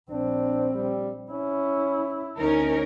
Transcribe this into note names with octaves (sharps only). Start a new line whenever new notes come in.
A#1 C4 D4
G3
C#4 E4
D2 C#4 D#4 A#4